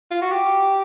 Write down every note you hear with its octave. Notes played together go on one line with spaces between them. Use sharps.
F4
F#4
G4